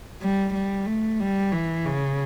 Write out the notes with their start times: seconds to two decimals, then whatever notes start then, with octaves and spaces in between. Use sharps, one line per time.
0.22 G3
0.54 G3
0.87 A3
1.20 G3
1.52 E3
1.86 C#3